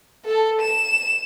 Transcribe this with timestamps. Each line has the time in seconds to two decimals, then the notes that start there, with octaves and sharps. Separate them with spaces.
0.25 A4
0.61 E7